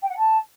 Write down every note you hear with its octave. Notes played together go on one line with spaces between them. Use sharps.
G5
F#5
A5